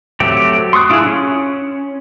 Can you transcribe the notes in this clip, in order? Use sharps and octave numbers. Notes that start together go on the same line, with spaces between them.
F#3 A3 C4 G4
C6 C#6 D#6 F#6
D4 E4 F4 G4 G#4
C#4